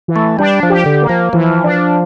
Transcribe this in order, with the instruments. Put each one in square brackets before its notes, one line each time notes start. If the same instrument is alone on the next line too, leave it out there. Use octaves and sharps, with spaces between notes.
[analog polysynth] E3
[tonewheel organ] A3
[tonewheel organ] G3 [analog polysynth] D4
[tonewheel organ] F3
[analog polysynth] G4
[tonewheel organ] D3
[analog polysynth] A#3
[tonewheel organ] F3
[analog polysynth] E3 [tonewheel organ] F3
[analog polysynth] D4